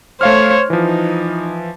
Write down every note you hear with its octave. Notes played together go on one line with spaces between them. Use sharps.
A3 C5 C#5 F5 F6
E3 F3 D#4